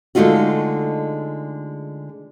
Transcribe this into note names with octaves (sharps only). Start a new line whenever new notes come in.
D3 G#3 A3 D#4 F4 F#4